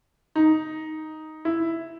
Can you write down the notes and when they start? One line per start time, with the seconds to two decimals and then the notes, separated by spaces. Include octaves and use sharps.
0.36 D#4
1.45 E4